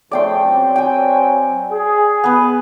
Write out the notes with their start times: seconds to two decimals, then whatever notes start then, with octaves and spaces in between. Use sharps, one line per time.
0.11 F2 C#3 A3 D5 G5 C6
0.43 F#3 C4
0.76 G5 G#5
1.72 G#4
2.24 B3 B4